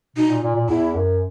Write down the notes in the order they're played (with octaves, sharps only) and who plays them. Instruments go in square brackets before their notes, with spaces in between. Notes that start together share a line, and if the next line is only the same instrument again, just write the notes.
[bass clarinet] B2 [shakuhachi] D#4
[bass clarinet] A#2
A#2
A#2
[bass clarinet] E2 [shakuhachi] E4
[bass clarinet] F#2